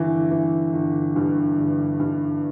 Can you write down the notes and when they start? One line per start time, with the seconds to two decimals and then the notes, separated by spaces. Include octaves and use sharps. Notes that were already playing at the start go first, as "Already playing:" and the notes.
Already playing: G1 E3
0.31 E3
0.73 G1
1.16 G2
1.57 G1
2.00 G2